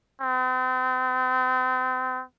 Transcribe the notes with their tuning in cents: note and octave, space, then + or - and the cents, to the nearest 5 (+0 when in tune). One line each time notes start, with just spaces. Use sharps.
C4 -40